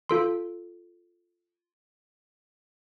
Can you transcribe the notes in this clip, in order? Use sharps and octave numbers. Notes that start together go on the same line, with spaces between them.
F4 A4 C6